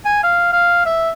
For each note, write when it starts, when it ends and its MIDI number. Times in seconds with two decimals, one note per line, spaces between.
0.05 0.19 80
0.23 0.48 77
0.52 0.85 77
0.86 1.10 76